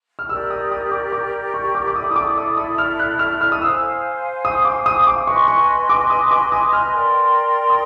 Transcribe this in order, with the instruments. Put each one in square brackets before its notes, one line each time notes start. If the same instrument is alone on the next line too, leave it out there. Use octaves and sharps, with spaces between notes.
[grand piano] F6
[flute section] G4 A#4 D5 [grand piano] E6
[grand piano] D#6
D#6
D6
D6
C#6
D6
D6
[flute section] E4 A4 D5 [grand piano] D#6
[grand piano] D#6
D6
D#6
D#6
F6
F#6
F6
F6
D#6
[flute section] C5 F5 G#5 [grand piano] E6
[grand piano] D#6
D6
D#6
D6
[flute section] B4 D#5 G#5 C6 [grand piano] C#6
[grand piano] C#6
D6
D#6
D6
D#6
F6
[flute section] A#4 D5 G5 C6
[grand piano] D#6